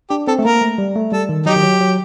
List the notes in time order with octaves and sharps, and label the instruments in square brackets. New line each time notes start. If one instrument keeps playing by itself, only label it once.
[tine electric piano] D4 [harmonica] G4
[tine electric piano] C4 [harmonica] A4
[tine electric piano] A3
[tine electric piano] A#3 [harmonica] A#4
[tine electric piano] A3
G3
A3
[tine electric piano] G3 [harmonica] A4
[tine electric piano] D#3
[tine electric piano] F#3 [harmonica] D#4 G4
[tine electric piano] D#3
F#3
F#3